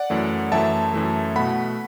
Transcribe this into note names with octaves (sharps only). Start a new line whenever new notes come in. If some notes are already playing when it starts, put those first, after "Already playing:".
Already playing: D5 F#5
F#2 E3 A3
F#2 E3 A3 E5 A5
F#2 E3 A3
B2 A3 F#5 B5